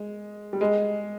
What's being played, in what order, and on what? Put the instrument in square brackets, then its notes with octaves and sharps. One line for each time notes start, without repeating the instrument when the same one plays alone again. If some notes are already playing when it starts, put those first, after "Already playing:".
Already playing: [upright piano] G#3
G3
G#3